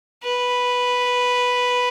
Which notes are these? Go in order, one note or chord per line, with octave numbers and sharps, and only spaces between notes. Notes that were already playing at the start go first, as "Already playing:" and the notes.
B4